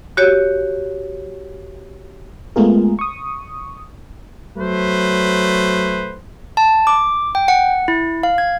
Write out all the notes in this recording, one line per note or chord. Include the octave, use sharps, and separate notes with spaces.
F#4 G4 C#5
G#3 A3 B3 F4 G#4 A#4
C#6 D#6
F#3 A3 B4 C5
A5
D6
G5
F#5
E4
F5
G#6